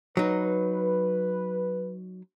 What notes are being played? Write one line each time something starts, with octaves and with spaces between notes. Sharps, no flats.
F#3 D#4 B4